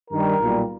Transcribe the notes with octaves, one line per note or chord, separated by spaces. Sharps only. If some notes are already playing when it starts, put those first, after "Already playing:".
G2 D#3 G3 A#4
B1 A#2 G3